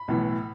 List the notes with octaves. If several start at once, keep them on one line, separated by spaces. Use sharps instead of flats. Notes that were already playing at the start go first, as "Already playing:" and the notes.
Already playing: B5
B1 A2 E3